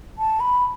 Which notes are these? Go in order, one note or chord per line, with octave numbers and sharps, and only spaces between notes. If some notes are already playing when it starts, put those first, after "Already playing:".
A5
B5